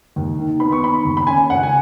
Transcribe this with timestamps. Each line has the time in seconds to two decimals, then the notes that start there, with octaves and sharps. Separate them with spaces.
0.16 D#2
0.39 D#3
0.60 B3 B5
0.72 C#6
0.83 D#4 B5
1.05 D#2
1.17 B5
1.27 C#4 G#5
1.50 C#2 F#5
1.63 G#5